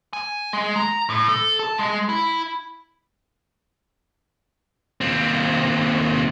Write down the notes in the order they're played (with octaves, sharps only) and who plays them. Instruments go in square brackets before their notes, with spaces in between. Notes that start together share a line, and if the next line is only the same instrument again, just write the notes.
[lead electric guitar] G#5
G#3
A#5
A2
A4
A5
G#3
E4
D#2 C4